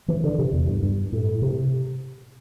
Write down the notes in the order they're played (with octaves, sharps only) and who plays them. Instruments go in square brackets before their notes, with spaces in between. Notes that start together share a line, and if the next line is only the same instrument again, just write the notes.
[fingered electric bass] E3
D3
C3
E2
G2
G2
A2
C3